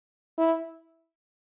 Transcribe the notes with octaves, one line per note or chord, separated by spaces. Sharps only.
E4